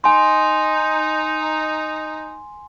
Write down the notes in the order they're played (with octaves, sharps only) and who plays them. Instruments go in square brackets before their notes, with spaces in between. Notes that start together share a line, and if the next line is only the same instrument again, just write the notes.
[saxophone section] D#4 [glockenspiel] G#5 C6